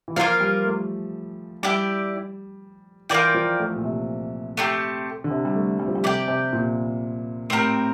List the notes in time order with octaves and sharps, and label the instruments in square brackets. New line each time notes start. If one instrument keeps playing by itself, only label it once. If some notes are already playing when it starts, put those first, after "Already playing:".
[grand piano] E3
[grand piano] F3 [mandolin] A#3 F4 A#4 F5
[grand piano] G3
A3
[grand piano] G3 [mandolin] E4 G4 D5
[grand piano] E3 [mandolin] F4 A#4 D5 G5
[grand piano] F3
A3
A#2
C3
[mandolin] A3 C4 G4
[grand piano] D3
C3
G3
A3
G3
F3
G3
[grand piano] C3 [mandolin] G4 D5 G5
[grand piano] C3
A#2
[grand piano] A2 [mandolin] C4 G4 A#4